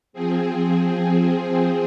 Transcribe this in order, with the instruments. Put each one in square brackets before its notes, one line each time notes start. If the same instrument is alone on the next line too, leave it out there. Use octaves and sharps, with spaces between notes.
[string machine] F3 C4 G#4